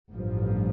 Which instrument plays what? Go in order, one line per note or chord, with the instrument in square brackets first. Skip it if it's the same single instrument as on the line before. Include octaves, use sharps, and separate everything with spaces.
[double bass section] A1 G2 F3